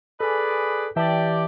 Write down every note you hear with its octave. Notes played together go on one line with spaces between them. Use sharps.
G#4 A4 B4 D5
E3 G4 D5 E5 A5